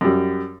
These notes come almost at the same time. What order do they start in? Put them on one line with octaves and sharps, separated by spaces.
F#2 G3 F#3